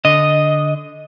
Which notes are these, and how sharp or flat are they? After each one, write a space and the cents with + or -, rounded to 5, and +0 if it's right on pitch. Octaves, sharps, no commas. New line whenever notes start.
D3 +0 D#5 +0